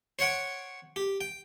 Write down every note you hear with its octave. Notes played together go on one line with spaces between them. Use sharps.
C5 C#5 F#5 G5
G4
G5